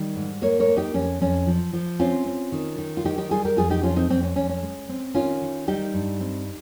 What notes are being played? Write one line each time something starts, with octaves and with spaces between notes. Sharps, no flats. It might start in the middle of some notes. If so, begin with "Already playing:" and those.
Already playing: D#3 G3
G#2
A#3 A#4 C#5
A#4 C#5
A#3
D#4 G4
F2 C#4
F2 C#4
F3
F3
C4 C#4 F4
C4
D#3
D#3
F4
D#3 D#4 G4
D#4 G4
G3 F4 G#4
G4 A#4
F2 F4 G#4
D#4 G4
F2 C#4 F4
C4 D#4
F2 C4
C#4
F2 C#4
C#4
G#3
C4
D#3 C#4 F4
D#3
G3 D#4 G4
G2
C4